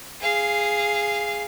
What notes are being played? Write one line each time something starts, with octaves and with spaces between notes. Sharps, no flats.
G#4 F5